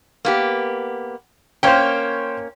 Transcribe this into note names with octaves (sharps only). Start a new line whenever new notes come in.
A#3 B3 G4
A#3 C#4 C5 C#5 G5